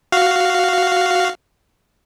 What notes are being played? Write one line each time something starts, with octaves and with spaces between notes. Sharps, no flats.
F#4 F5